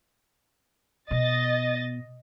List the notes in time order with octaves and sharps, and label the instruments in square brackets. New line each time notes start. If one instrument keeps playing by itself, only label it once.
[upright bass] B2 [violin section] D#5 A6